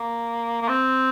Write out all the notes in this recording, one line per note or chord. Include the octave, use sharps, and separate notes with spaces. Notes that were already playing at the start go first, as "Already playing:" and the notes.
Already playing: A#3
A#3
C4